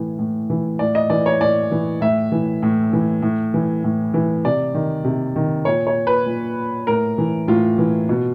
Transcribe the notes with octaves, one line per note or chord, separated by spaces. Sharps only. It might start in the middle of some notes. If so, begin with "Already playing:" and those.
Already playing: A2 E3
A2
E3
A2 D5
D#5
E3 D5
C#5
A2 D5
E3
A2 E5
E3
A2
E3
A2
E3
A2
E3
C3 D5
D#3
C3
D#3
A#2 C#5
C#5
B4
A#2
A2 A#4
E3
A2 F4
E3
B2